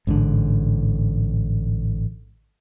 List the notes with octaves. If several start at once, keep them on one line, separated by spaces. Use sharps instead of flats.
A1 G#2 B2 D3